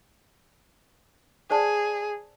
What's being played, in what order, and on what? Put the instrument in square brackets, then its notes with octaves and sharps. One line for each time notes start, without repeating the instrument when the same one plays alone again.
[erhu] G#4 [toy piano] C5 D5 A5